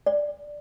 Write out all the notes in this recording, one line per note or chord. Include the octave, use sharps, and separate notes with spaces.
D5